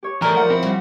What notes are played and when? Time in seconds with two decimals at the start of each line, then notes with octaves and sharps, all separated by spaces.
0.03 G4 C#5
0.22 D#3 E3 G3 A3 A#3 A#4
0.36 F3 F5 F#5
0.50 C4 E4
0.63 C#3 G3 F#4